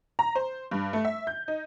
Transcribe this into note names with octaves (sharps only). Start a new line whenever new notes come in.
A#5
C5
G2
A3
E5
G6
D#4